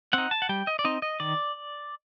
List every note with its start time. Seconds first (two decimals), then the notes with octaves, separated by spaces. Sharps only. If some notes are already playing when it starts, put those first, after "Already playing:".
0.13 C4 D#4 F#5
0.31 A5
0.42 F#5
0.49 G3 G5
0.67 D#5
0.79 D5
0.85 C4 D#4 D#5
1.02 D#5
1.20 D#3 D5